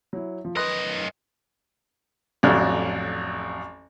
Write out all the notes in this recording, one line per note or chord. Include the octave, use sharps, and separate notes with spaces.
F#3 E4
F3
F#2 B4 D#5 C6 F#6
A1 F2 F#3 D4 F6